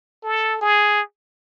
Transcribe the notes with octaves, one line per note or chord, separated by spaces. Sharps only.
A4
G#4